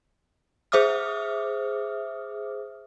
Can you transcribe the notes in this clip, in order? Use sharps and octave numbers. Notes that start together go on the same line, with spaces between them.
G#4 C5 E5 D6 D#6 F6